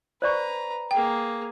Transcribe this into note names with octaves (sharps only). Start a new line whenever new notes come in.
B4 C5 D5 A#5 C#6
A#3 G#4 G5